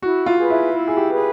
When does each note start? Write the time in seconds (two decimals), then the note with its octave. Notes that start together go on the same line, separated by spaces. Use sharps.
0.02 E4 F#4
0.26 F4
0.38 G#4 B4
0.50 E4
0.74 E4
0.88 G#4
0.97 G4
1.10 G#4 B4